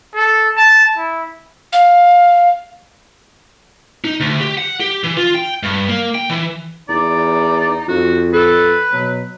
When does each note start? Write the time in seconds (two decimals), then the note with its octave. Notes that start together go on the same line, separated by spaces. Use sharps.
0.15 A4
0.57 A5
0.96 E4
1.73 F5
4.04 D#4
4.20 D2
4.40 G4
4.58 F#5
4.80 G4
5.04 E3
5.17 F4
5.35 G5
5.63 G2
5.88 A#3
6.15 G5
6.29 E3
6.89 E2 D#4 D5
7.88 F2 F#4
8.33 A4 B4
8.93 B2 F#3